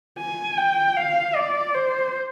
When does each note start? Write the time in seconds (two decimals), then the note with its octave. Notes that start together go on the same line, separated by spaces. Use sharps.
0.19 G#5
0.57 G5
0.96 F5
1.36 D5
1.74 C5